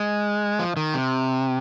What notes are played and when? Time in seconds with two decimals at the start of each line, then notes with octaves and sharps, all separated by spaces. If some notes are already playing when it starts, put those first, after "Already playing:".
Already playing: G#3
0.59 F3
0.77 D#3
0.94 C3